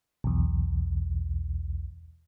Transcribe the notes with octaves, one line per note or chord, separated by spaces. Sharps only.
B1 E2